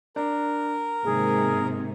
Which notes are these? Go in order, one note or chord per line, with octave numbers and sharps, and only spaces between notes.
D4 A#4
G#2 C3 D#3 A#3 G#4